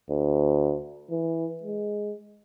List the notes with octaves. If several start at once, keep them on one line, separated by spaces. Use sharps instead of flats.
D2
E3
G#3